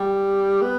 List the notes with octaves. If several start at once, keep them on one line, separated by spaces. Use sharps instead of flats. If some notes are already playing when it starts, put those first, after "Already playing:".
Already playing: G3 G5
B3